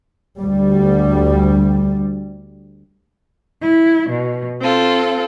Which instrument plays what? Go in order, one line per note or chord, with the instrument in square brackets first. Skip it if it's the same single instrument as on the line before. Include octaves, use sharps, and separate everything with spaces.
[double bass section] D2 G3
[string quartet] E4
B2
C4 F4 A4